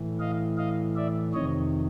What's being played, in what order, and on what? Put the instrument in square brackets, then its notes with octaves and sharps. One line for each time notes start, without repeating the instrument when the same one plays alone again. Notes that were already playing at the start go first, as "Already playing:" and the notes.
Already playing: [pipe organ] A2 E3
D#5 F5
D#5 F5
D5 E5
F2 C3 D#3 C#5 D#5